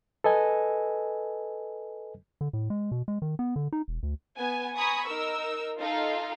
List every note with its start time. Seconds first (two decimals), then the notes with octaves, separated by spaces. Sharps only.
0.24 A4 B4 D#5 G#5
2.41 D3
2.53 A2
2.70 G#3
2.91 B2
3.08 G#3
3.22 D#3
3.39 B3
3.56 D3
3.73 D#4
3.88 E1
4.03 D2
4.38 B3 G#5
4.76 G#5 A#5 B5 C#6 D#6
5.07 D#4 A#4 E6
5.79 D#4 F4 A4 F5